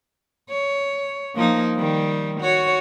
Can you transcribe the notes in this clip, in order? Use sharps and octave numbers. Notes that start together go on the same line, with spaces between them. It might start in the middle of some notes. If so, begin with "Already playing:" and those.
C#5
F3 A#3 D#4
D#3 G3
F#4 C#5